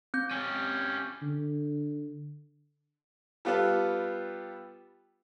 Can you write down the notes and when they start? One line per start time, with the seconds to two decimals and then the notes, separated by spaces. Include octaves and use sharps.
0.14 C4 G6
0.31 C#4 G4
1.22 D3
3.45 G3 B3 F4 G4 A4 B4